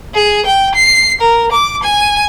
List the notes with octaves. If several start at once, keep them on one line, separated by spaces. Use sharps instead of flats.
G#4
G5
C7
A#4
D6
G#5